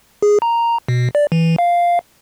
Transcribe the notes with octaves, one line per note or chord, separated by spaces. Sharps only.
G#4
A#5
B2
D5
E3
F5